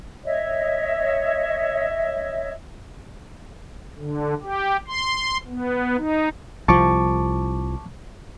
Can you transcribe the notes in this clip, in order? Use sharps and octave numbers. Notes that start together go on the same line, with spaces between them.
C#5 D#5 E5
D3
G4
C6
B3
D#4
C2 F3 A5 C#6 D6